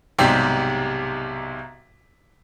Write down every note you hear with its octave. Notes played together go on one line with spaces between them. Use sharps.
B1 G#2 C3 G3 C4 G4